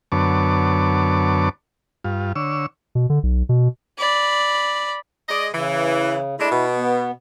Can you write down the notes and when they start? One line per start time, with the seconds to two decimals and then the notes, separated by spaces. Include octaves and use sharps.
0.12 F#2 D3 B3 C#5 A5 D6
2.04 G2 F4
2.36 D3 C#5 E6
2.95 B2
3.10 D3
3.23 B1
3.49 B2
3.98 D5 B5
5.28 G#3 D5 D#5
5.52 C#3 E3
6.38 G#3 A3 D4 E4
6.50 B2
6.75 B3